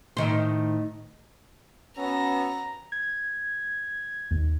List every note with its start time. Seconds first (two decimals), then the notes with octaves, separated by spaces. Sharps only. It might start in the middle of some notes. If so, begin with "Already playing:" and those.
0.17 A2 D#3 C5
1.97 B3 C#4 F#4 A4 A#5
2.92 G#6
4.31 D#2